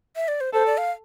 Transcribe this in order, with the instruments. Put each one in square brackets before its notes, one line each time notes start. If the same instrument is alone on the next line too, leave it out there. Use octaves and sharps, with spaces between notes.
[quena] E5
D5
C5
[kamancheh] A4 [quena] C5
[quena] D5
F5